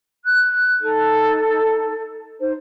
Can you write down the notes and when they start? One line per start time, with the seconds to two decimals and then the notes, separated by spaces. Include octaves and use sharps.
0.25 F#6
0.81 D#4 A4
2.40 D#4 C5